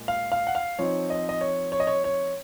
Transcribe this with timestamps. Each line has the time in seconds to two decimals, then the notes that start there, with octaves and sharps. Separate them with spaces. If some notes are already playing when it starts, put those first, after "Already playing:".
Already playing: A#2 G#3
0.08 F5
0.32 F5
0.47 F#5
0.55 F5
0.79 F3 C4 D#4 C#5
1.10 D#5
1.29 D#5
1.41 C#5
1.72 C#5
1.80 D#5
1.87 C#5
2.04 C#5